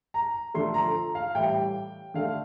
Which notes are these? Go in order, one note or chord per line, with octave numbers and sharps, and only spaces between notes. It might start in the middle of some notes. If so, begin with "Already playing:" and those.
A#5
D3 F3 A3 C6
A#5
F5
A2 E3 G3 G5
D3 A3 F5